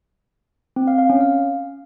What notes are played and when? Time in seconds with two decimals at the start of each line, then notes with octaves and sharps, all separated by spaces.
0.76 C4
0.87 F5
0.99 F5
1.10 C#4
1.21 F5